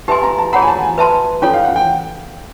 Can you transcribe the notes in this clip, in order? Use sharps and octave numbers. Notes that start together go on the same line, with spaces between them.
G4 B4 E5 G#5 A5 C6
A#5
A5
G#4 C#5 F#5 A#5 B5
G#5
A5
G#5
B4 E5 A5 C6
C#4 F4 A4 C#5 G5
F5
F#5
G5